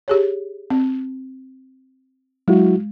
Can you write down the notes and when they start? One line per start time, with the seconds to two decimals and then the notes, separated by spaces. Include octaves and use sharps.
0.08 G4 G#4 C#5
0.70 C4
2.48 F#3 G#3 E4 F#4